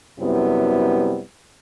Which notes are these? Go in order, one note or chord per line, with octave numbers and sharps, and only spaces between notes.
F#2 C3 G3 B3 E4